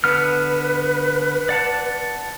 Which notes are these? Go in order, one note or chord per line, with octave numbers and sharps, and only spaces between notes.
D3 B3 B4 F6
D5 F#5 A5